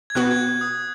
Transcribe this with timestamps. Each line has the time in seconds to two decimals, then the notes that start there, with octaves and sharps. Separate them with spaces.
0.10 G#6
0.15 B2 B3 F#4 F#6
0.31 G#6
0.61 D#6